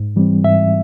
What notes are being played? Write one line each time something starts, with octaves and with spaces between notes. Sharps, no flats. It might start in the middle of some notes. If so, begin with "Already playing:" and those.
Already playing: G#2
E3 G3 C4
G#2 E5